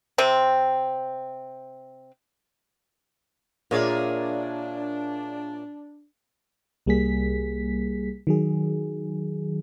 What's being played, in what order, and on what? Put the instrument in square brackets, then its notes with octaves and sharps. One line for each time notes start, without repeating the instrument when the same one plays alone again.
[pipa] C3 C4
[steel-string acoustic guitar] A#2 C#5 E5 [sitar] A#3 G#4 D5 [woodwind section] D4
[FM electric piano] C2 G3 A#3 G#4 B6
D#3 F#3 G#4